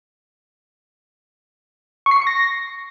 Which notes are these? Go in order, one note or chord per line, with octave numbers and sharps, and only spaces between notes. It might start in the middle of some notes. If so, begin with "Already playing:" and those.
C#6
C7
C#6
C#7
A#6